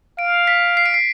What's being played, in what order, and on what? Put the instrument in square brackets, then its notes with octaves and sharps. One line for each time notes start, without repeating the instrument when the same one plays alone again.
[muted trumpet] F5 [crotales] D7
[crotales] B6
C7
D7
C7